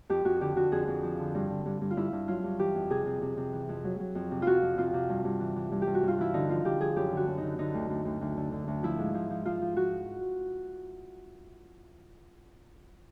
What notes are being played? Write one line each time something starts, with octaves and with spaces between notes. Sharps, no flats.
F2 G4
F2 F#4
D3 G4
D3 F#4
F2 G#4
F2
F3
D3
G2
D3
G2
G2
F4
G2 E4
G2
F#3 F4
G2
E3 G4
F2
C3 G#4
C3
C3
C3
E3
F2
F#3
F#3
F2
C3
F2 F4 F#4
F2
C3 F4
C3
G2
G2
E3
E3
G2
G4
G2
F#4
G2 F4
E3 E4
D3 D#4
F3 F4
D3 G4
F3 G#4
F#2 G4
D3
F#4
F#2
D#4
D3
D3 D#4
D2
D2
D2
D2
D3
D3
D2
F3 E4
G#2
F3
F3
F3 F4
F3
F3 F#4